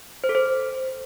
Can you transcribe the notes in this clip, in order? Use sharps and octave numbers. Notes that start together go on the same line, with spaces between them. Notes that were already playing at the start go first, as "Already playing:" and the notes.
C5
A4
C5